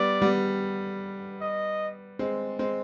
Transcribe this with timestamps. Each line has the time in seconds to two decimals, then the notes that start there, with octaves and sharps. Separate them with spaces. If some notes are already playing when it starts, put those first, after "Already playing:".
Already playing: G3 B3 D5
0.22 G3 B3
1.41 D#5
2.19 G#3 C4
2.59 G#3 C4